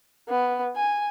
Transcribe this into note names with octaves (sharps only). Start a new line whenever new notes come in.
B3
G#5